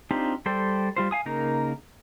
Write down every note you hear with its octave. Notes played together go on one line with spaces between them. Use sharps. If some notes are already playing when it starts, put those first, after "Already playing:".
C4 D4 D#4 F4 G4
G3 A4 C5 D5 G5
G3 F4 C5
F5 G#5 D#6
C#3 A#3 D#4 A#4